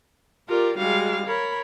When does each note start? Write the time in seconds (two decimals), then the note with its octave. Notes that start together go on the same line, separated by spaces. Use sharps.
0.48 F4 G4 A#4 D5
0.78 G3 G#3 F#4 F5
1.26 A#4 C#5 B5